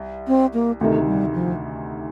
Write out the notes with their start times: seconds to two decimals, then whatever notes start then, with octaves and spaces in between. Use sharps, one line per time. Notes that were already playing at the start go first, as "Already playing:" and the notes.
Already playing: C2
0.28 C4
0.54 A#3
0.81 D2 C3 D#3 A3
1.06 G3
1.34 F3